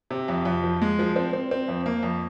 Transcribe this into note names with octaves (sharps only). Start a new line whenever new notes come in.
C3
F2
F2
F3
G#3
F3
C4
C4
C4
F2
A#3
F2